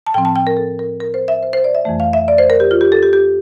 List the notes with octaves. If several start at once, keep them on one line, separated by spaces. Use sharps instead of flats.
A5
A2 F3 C4 G5
A5
G5
A#4
A4
A#4
A#4
C5
E5
C5
C5
D5
E5
F2 E3 A3
F5
E5
D5
C5
A#4
G4
F4
G4
A4
G4
G4